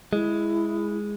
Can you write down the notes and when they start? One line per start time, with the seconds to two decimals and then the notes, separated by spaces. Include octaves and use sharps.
0.13 G#3 E4